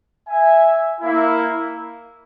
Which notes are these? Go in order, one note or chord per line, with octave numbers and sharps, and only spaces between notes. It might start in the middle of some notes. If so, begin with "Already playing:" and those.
E5 G#5
A#3 E4